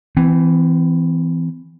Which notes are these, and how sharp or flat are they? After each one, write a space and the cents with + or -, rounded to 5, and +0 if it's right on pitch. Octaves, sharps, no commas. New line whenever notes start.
E3 +0 C4 -35